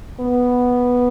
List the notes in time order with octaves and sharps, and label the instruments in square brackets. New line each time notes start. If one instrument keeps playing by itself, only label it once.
[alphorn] B3